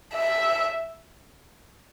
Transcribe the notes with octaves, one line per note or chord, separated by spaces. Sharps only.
E5